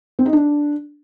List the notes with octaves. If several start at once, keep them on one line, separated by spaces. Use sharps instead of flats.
C4
D#4
D4